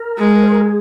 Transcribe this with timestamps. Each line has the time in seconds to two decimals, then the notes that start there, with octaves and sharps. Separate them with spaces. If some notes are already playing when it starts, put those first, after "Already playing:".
Already playing: A#4
0.18 G#3
0.43 C5
0.52 A#4
0.61 G#4